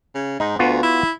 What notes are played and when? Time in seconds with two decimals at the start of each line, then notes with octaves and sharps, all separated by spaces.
0.15 C#3
0.40 G#2 D#4
0.59 D2 B3 F4 F#4
0.83 E4